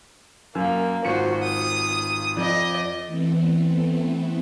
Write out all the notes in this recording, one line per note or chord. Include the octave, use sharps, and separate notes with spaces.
F#2 A#3
G#1 F4 F#4 C5 C#7
D#6
F2 D5 D#5
E3 A3 B3 C4